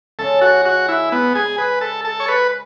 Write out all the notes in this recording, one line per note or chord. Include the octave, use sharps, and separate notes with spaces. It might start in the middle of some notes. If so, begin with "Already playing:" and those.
C#3 G#3 C#4 A4
F#4
F#4
E4
B3
G#4
B4
A4
A4
C#5
B4